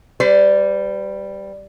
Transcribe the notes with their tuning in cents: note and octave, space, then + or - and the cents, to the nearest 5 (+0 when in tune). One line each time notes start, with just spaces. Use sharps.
G3 +0 C5 -45